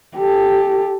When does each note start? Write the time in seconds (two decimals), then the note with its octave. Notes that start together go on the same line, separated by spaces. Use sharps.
0.17 G4 A4